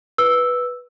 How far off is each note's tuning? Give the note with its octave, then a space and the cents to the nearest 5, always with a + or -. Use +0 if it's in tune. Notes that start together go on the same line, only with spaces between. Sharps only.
B4 -5 E6 +0